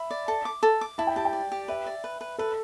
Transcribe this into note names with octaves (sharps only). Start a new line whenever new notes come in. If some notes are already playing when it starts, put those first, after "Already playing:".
Already playing: E5 B5
D5
A4
D6
A4
D6
E4 A5
G5
G4 A5
G5
D5
G4
B4 E5
D5
B4
B4
A4 B4